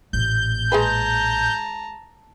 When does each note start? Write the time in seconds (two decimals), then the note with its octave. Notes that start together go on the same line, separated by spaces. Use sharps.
0.13 A1 A#2 G6
0.72 G#3 G#4 B4 A5 A#5